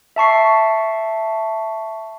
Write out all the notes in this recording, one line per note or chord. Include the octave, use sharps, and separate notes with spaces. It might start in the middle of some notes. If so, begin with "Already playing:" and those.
E5 A5 C#6 C7